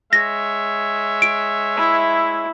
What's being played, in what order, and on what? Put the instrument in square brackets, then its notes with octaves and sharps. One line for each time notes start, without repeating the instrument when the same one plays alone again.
[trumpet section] G#3 C#5 E5 [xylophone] A#6
[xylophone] D7
[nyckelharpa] E4